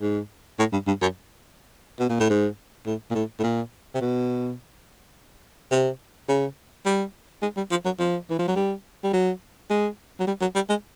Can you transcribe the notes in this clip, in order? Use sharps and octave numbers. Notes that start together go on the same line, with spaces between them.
G#2
A2
G2
G2
F#2
B2
A#2
A2
G#2
A2
A#2
A2
A2
A#2
C3
B2
C3
C#3
G3
G#3
G3
F3
F#3
F3
E3
F3
F#3
G3
G3
F#3
G#3
F#3
G3
F#3
G3
G#3